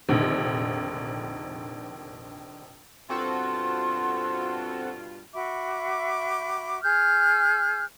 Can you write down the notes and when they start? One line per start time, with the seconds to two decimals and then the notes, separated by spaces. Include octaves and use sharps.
0.09 F1 A#1 D3 D#3
3.10 G2 B2 C4 F4 F#4 A4 C6
5.34 F#4 E5 B5 D6
6.82 G#4 F6 G6